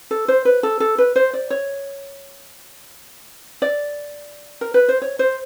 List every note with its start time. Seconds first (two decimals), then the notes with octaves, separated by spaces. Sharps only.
0.11 A4
0.28 C5
0.45 B4
0.63 A4
0.80 A4
0.98 B4
1.16 C5
1.34 D5
1.50 C#5
3.62 D5
4.61 A#4
4.74 B4
4.88 C5
5.02 C#5
5.19 C5